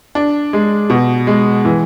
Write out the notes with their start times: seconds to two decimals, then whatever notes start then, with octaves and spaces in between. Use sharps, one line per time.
0.15 D4
0.53 G#3
0.90 B2
1.27 G#3
1.65 E3